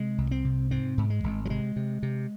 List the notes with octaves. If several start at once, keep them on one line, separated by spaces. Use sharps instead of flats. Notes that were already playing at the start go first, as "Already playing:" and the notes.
Already playing: C3 G#3
C2
C4
C3
G#2 C4
G#2
G#3
G#1
F#3
C3 G#3
C3
C3